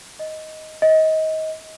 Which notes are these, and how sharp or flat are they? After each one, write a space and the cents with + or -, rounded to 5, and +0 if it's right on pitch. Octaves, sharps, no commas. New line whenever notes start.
D#5 +10
D#5 +25